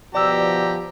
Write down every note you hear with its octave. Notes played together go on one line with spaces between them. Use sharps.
B2 F3 G4 D5 A#5 E6